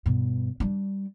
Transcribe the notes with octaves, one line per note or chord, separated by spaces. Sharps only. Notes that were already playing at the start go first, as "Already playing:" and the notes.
G2 B2
G3 D4